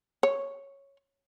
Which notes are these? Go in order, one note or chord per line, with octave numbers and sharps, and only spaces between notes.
C#5